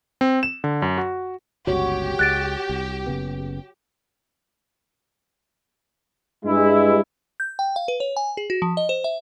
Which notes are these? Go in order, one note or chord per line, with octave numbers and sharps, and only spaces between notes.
C4
E7
D3
F#2
F#4
G1 C#2 F#4 G4 C#5
C#2 G#3 F#6 A6 D7
C2
F#1 C#3 B3
G2 G#3 E4
G6
G5
F5
B4
C#5
G#5
G#4
F#4
F3
D#5
C5
E5